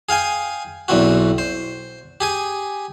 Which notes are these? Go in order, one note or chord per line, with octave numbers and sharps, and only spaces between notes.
G#4 F5 G5 G#5
B1 E2 E3 C4 F#4
C5
G4 G#4 G#5